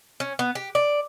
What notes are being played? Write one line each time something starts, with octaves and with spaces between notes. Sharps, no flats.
C#4
B3
G4
D5